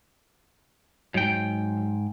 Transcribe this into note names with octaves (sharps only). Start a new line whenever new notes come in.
G#2 F#3 G5